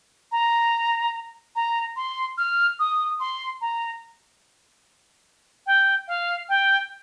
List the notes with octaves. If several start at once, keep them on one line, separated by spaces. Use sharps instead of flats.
A#5
A#5
C6
F6
D#6
C6
A#5
G5
F5
G5